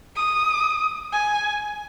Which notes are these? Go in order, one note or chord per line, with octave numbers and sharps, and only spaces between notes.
D#6
G#5